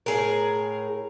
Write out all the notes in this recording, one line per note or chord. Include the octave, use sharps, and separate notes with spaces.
A2 G#4 A#4